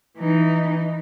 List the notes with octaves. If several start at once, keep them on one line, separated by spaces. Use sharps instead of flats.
E3 D#4